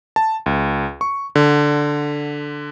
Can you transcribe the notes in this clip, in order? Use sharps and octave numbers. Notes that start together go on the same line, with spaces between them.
A5
C#2
C#6
D3